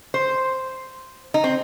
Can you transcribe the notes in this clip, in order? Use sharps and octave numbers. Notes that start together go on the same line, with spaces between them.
C5
D#4
C4